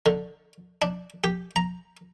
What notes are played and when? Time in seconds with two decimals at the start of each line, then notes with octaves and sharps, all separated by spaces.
0.06 D3
0.82 D4
1.24 G4
1.56 A#5